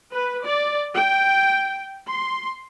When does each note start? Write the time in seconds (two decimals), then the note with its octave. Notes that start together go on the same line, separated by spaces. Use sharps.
0.12 B4
0.45 D5
0.97 G5
2.08 C6